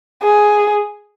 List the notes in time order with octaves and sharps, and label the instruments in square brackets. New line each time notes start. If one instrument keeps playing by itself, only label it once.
[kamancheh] G#4